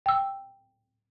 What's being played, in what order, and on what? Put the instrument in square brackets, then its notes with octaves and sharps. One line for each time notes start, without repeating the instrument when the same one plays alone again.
[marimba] G5 E6